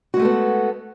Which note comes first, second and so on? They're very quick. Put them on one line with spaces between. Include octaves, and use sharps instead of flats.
F#4 G#3 A3 A4 B3